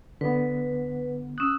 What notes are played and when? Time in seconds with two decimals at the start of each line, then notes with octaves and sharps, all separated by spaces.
0.21 D3 B3 B4
1.38 C#4 D#6 E6 F#6